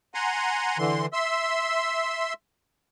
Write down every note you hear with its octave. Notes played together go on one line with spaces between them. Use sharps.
F#5 G#5 A#5 C6
D3 E3 C6
E5 C6 E6